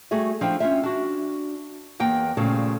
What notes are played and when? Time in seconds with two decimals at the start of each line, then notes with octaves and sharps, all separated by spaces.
0.11 G3 A3 F#4 G#4 E5
0.41 F3 D4 E4 G5
0.60 C#4 D4 F4 E5
0.83 D4 F#4
2.00 E2 A#3 G5
2.37 A#2 C#3 F3 G3 A3